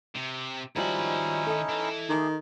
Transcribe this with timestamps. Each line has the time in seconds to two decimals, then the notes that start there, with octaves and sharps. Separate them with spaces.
0.15 C3
0.76 D#3 F3 G3 C#4 D#4 E4 F#4 B5
1.47 A4 D#5
1.69 E3
2.10 D#3 A3 G4 G#4